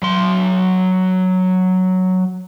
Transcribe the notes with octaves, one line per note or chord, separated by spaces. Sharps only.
F#3 C6